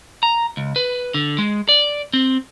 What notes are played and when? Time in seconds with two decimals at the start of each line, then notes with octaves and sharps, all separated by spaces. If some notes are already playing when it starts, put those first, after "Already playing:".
0.23 A#5
0.57 C#2
0.76 B4
1.14 D3
1.38 G#3
1.69 D5
2.13 C4